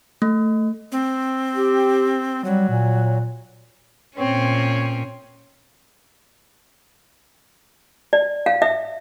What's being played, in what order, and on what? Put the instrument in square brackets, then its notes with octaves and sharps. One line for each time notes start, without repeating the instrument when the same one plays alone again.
[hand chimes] A3
[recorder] C4
[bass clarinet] G4
[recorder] F#3 [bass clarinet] G3
[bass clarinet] A#2
[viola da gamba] A#2 C#4 [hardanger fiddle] C4 [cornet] C#5
[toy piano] D5
F5
E5